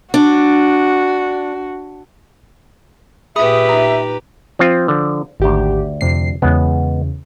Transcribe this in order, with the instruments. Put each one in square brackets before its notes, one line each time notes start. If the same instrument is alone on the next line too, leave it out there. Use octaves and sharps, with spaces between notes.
[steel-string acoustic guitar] D4 [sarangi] F#4
[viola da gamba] A#2 G4 B4 [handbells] G#4 B5 D#6 [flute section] E5
[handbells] D#4 A#5
[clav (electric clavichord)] F3 C4 F4
D3 F3
[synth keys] G#1 G4 [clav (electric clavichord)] D2 A#5
[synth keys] F2 C3 C7
[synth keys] E2 C#3 [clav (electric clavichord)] G#3 B3